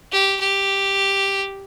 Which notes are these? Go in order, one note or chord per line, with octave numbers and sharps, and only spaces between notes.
G4
G4